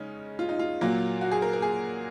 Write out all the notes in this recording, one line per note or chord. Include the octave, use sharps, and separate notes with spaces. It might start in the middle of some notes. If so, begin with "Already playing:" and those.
Already playing: C#3 G#3 C#4 D#4
F4
D#4
F4
A#2 F#3 A#3
F#4
G#4
A#4
A#4
G#4